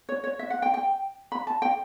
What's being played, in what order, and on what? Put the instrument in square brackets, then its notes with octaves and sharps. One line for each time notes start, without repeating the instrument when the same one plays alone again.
[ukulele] C#5
C#5
E5
F#5
G5
G5
B5
A5
G5